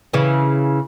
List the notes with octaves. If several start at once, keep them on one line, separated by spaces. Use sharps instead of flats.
C#3 E3